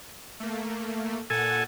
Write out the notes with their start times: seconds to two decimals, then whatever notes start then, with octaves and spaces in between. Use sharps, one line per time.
0.40 A3 A#3
1.30 A#2 A4 F#5 G#5